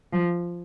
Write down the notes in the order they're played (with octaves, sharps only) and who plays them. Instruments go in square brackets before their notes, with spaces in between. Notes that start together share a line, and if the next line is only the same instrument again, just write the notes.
[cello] F3